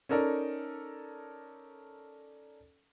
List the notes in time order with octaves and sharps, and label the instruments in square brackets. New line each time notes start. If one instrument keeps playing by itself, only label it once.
[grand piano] C#4 D#4 A4 A#4 D5